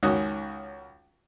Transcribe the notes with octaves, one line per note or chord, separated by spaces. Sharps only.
C#2 D#3 C#4 F#4 D#6